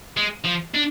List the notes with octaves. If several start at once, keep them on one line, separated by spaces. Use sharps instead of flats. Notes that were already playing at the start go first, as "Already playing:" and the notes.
G#3
F3
D4